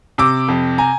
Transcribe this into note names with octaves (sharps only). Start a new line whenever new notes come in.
C3 D6 E6
F2
G#5 A#5